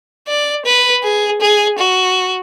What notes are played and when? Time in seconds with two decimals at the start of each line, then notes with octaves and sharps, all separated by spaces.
0.28 D5
0.65 B4
1.03 G#4
1.41 G#4
1.78 F#4